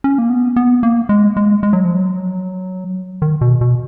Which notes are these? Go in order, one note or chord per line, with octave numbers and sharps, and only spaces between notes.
C#4
A#3
B3
B3
A#3
G#3
G#3
G#3
F#3
F3
F#3
D#3
B2
B2